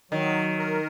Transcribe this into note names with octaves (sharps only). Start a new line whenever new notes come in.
D#3 F#3
A#4